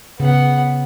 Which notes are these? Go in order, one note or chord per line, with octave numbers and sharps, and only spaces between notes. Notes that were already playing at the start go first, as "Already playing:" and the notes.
C#3 B3 F#5